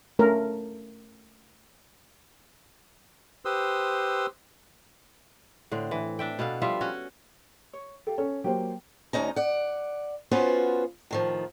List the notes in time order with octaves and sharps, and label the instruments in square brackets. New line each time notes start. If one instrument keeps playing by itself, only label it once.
[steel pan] A3 C#4 A#4
[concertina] G4 B4 C5 C6 D#6 E6
[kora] A2 D3 C4
E3
D4 E5 G5
B2 B3 A4 F5
F3 G3 F4 E5
C#4 F#4 C#5
[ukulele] C#5
[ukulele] G4 F5 [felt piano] A4
[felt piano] C#4 A4 [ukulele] C#5
[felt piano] F#3 A#3 C5 [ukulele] G4
[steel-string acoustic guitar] D2 C#4 D#4 A#5
D5 F#5
B3 C#4 F4 F#4 B4 C5
A2 D#3 F3